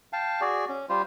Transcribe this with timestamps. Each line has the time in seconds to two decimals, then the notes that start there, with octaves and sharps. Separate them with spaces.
0.13 F5 G5 A5
0.41 F#4 G#4 D5
0.69 C#4
0.89 G3 F4 C5